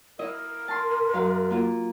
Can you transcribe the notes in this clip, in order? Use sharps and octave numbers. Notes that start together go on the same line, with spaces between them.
E4 A#4 D#5
A5 C6
F#2 F5
A#3 F4